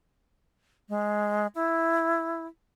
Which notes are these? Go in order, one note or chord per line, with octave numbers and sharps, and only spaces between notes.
G#3
E4